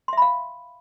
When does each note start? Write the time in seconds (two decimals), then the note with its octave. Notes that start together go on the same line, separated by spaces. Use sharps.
0.08 C6
0.13 E5
0.17 B5
0.22 F5